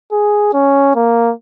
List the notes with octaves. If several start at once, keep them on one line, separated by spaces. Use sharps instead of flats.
G#4
C#4
A#3